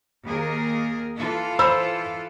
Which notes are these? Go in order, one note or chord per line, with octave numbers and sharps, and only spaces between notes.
D#2 G#4 A#4
E3 F4 A4
C5 B5 E6